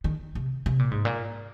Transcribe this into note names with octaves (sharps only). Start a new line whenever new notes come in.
D#3
C3
C3
A#2
G#2
A#2